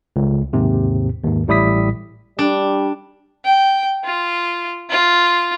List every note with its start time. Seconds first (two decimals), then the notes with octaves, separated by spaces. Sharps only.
0.16 C#2
0.53 D#2 G#2 C3
1.24 D#2 G#2
1.47 A1 A2 G3 E4 D#6 B6
2.39 G3 D4
3.44 G5
4.04 F4
4.90 F4